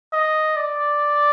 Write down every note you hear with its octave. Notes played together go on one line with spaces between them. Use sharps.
D#5
D5